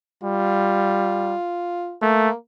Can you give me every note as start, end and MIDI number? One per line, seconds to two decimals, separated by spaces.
0.24 1.35 55
0.24 1.96 65
2.02 2.29 57
2.02 2.35 58